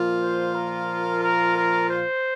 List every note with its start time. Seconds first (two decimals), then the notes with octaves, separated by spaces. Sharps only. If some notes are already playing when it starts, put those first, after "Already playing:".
Already playing: A#2 F3 A#3 F4
0.21 C5
0.55 A#4
1.23 A#4
1.56 A#4
1.89 C5